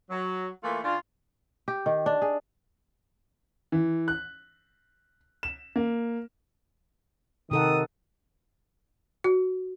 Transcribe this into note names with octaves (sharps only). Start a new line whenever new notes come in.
F#3
E3 A3 A#3 F4
C#3 D4 F4
G4
D#3
D4
G#4
E3
F#6
E7
A#3
C3 D#3 A4 F#5 D#6
F#4